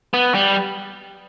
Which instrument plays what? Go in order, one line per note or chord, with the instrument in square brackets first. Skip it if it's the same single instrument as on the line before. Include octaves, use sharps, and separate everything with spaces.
[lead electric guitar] B3
G3